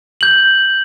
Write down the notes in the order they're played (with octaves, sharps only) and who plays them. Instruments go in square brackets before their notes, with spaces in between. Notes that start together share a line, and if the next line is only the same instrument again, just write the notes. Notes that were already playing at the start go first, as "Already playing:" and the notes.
[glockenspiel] G6 F#7